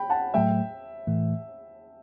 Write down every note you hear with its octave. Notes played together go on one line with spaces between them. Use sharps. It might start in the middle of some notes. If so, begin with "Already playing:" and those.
Already playing: G5 B5
F#5 A5
A2 F#3 A3 E5 G5
A2 E3 A3